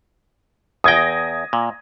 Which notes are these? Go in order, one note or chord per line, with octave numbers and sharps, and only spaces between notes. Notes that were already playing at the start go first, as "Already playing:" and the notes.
E2 G5 D#6 G#6 A#6
A#2